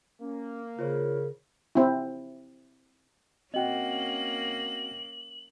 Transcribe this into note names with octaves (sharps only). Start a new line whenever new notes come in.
A#3 C#4
C#3 F4 A#4 C5 C#5
C4 E4
A#3 C4 C#4 F#4 D#5 F#5 G5 F#7